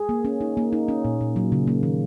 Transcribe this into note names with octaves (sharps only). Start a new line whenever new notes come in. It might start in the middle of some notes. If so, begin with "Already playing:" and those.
Already playing: G#4
A#3
C#4
D#4
A#3
D#4
C#4
A#2
A#2
F#3
C#3
A#3
D#3